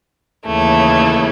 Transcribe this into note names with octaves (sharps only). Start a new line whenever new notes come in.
D#2 C#3 E3 A3